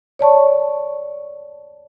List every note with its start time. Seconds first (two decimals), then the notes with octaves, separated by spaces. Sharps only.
0.19 C#5 D5 A5 C#6